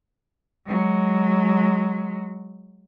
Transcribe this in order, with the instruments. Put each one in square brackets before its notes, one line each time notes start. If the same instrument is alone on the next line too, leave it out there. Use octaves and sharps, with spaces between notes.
[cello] F#3 G#3